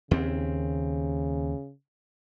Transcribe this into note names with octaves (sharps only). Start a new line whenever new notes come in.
D#2 C#3 C4